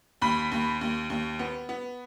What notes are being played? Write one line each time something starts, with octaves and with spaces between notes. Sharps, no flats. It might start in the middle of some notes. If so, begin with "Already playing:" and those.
D#2 B5
D#2
D#2
D#2
B3
B3